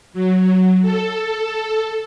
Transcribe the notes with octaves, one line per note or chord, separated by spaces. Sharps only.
F#3
A4